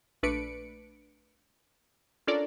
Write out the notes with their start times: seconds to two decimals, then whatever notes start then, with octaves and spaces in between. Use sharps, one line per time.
0.23 A#1 A3 D4 B4 C#7 D7
2.27 C#4 D4 F4 A4 A#4 D5